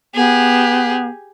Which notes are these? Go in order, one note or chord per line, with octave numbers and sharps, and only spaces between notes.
B3 G4 G#4